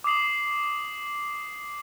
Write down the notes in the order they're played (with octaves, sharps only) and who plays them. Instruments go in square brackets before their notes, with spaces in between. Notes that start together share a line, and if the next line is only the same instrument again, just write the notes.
[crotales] D6 D#6 C7 F#7